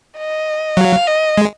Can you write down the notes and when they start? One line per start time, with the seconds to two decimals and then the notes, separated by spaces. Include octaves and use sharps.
0.18 D#5
0.77 F#3 F5
1.07 D#5
1.37 G#3